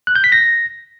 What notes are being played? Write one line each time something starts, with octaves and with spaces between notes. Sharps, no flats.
F#6
G6
B6
A#6